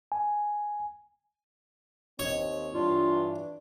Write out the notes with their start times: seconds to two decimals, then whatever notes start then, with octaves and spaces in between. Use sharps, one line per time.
0.12 G#5
2.19 D#2 C4 C#5 D#5
2.74 G2 E3 D4 F4